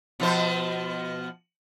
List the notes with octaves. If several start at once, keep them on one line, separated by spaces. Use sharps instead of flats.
B2 F3 C5